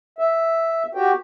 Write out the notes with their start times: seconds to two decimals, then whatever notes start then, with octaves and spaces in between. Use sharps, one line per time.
0.19 E5
0.95 F#4 G4 G5